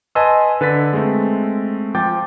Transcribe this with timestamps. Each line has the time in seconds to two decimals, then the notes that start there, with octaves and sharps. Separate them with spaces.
0.15 B4 D#5 G#5 A5 C6 E6
0.61 D3 B4 A6 B6
0.93 G#3 A3 C4
1.95 F3 G5 D6 G6 A6